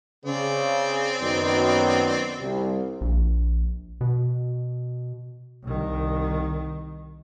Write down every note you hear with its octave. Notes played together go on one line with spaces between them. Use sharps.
C#3 C4 D5
F#2 D#3 B3
C2
A#1
B2
C2 D#3